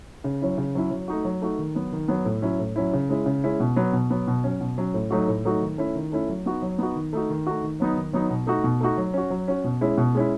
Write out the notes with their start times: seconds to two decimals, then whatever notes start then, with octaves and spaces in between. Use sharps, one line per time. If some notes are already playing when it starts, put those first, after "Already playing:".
0.24 C#3
0.42 F#3 C#4 E4
0.58 C#3
0.75 F#3 C#4 E4
0.91 F#3
1.08 A3 D#4 F#4
1.25 F#3
1.42 A3 D#4 F#4
1.58 D#3
1.75 F#3 B3
1.92 D#3
2.08 F#3 B3
2.25 A2
2.42 F#3 C#4 E4
2.59 A2
2.76 F#3 C#4 E4
2.93 C#3
3.09 G#3 C#4 E4
3.26 C#3
3.44 G#3 C#4 E4
3.60 B2
3.76 F#3 B3
3.93 B2
4.10 F#3 B3
4.28 B2
4.44 F#3 C#4
4.61 B2
4.78 F#3 C#4
4.94 A2
5.11 F#3 A3 D#4 F#4
5.28 A2
5.45 F#3 A3 D#4 F#4
5.62 D#3
5.78 A3 C#4 E4
5.95 D#3
6.12 A3 C#4 E4
6.29 F#3
6.46 B3 D#4 F#4
6.62 F#3
6.78 B3 D#4 F#4
6.96 D#3
7.13 A3 D#4 F#4
7.30 D#3
7.47 A3 D#4 F#4
7.63 D#3
7.80 F#3 B3 D#4
7.97 D#3
8.13 F#3 B3 D#4
8.30 B2
8.47 A3 D#4 F#4
8.64 B2
8.81 A3 D#4 F#4
8.97 F#3
9.14 C#4 F#4
9.30 F#3
9.48 C#4 F#4
9.64 B2
9.81 G#3 C#4 E4
9.98 B2
10.15 G#3 C#4 E4